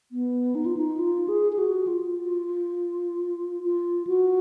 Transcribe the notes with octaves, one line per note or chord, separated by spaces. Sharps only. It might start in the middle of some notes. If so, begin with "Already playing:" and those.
B3
D#4
F4
D#4
F4
G#4
G#4
F#4
F4
F4
F#4